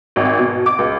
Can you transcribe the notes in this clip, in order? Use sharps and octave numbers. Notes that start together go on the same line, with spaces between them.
G#1
B2
D6
C#2